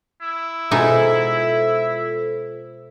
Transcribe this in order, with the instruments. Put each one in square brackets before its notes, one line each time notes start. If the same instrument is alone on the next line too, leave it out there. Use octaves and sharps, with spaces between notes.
[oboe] E4
[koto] B2 G#3 D#4 [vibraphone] F4 A4 C5 [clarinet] E5